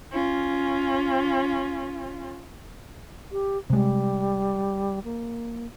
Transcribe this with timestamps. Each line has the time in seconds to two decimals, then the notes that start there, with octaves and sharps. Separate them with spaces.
0.12 C#4 F4
3.32 G4
3.70 C3 G3 G#3
5.04 A#3